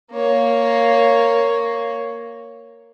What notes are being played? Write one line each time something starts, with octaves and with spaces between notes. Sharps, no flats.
A#3 C#5